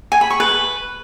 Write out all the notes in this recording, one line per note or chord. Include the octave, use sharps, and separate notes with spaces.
G#5
B5
C#6
B4